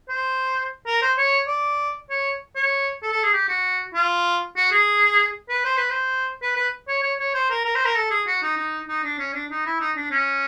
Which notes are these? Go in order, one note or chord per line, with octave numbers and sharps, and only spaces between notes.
C5
A#4
C5
C#5
D5
C#5
C#5
A4
A4
G#4
G4
F#4
F4
F#4
G#4
B4
C5
B4
C5
B4
B4
C#5
C#5
C#5
C5
A#4
A#4
C5
A#4
A4
G#4
F#4
D#4
D#4
D#4
D4
C#4
D4
D#4
E4
D#4
D4
C#4